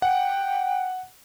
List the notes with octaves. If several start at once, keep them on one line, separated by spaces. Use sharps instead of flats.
F#5 G5